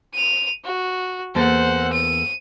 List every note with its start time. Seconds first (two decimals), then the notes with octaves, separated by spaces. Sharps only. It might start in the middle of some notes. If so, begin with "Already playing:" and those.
0.14 D#7 F7
0.65 F#4
1.35 E2 A#3 A4 C5 F#5
1.93 D#7